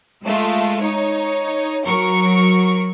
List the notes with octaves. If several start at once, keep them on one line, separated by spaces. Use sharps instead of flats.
G#3 A3 F4
D#4 C#5
F#3 A#4 C#6